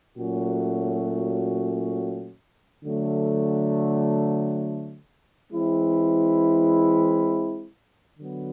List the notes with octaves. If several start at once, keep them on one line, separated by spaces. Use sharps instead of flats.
A#2 F#3 A3 C#4 F#4
D3 F#3 A3
E3 G#3 C4 E4
D3 F#3 B3